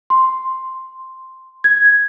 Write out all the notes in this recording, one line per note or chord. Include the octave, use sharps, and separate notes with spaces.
C6
G#6